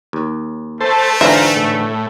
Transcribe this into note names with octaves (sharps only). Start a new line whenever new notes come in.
D#2
A3 A4 C5
G#2 D3 E3 F4 C5 E5 A#5
A2